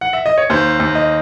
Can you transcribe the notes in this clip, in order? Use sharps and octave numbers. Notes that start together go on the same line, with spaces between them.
F#5
E5
D#5
C#5
D#2 C5
D#2
D#5